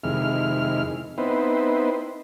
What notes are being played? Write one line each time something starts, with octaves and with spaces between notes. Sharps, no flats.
F2 C3 D#3 G#3 E4 F6
B3 C4 D#4 E4 B4 C5